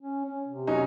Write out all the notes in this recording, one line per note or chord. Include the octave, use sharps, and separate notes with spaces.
C#4
C#4
C3
F#3 C#4 D#4